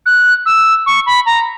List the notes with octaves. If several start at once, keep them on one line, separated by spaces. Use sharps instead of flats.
F#6
E6
C#6
B5
A#5